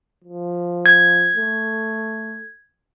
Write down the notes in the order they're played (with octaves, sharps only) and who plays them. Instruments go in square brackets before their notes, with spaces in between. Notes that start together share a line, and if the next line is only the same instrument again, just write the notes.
[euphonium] F3
[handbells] G#6
[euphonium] A3